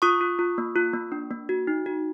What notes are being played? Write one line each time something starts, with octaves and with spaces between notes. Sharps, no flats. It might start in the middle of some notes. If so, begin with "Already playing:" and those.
F4 C#6 D#6
F4
F4
A#3
F4
A#3
D4
A#3
F#4
D#4
F#4